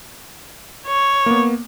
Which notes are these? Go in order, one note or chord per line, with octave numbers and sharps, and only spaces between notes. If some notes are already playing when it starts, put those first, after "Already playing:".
C#5
A#3 B3